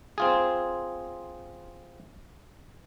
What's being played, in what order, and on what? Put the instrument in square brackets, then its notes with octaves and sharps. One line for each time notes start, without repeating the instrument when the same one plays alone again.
[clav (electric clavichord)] C4 F4 G#4